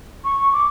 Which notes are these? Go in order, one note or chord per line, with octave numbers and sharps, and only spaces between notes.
C#6
D6